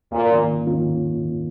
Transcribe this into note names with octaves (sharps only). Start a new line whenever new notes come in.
D#2 A#2
D#3 A#3 C#4 F4
D#2
D#3 A#3 C#4 F4